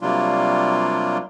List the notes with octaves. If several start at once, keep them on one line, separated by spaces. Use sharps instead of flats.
C3 F#3 G3 A#3 D4 F4